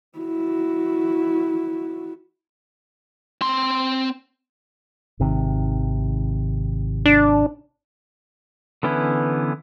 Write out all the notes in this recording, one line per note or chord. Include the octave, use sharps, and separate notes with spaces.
E4 F#4
C4 C6
G#1 C3 D#3
D4
D3 E3 B3 C#4 E4